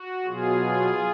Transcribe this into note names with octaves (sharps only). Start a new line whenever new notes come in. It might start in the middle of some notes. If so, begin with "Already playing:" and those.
Already playing: F#4
B2 F#3 F4 G#4